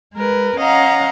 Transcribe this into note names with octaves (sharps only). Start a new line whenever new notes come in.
G#3 A#4 B4
C#4 D#5 F5 F#5 A#5